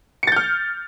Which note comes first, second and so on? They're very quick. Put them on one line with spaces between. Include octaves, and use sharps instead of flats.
C#7 A6 G6 F6